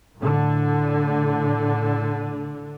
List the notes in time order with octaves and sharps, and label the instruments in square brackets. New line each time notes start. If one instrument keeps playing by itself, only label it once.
[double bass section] A2 D3